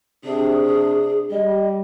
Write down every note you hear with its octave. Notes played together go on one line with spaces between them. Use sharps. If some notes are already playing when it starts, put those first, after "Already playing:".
C3 D4 G#4
G3 D#5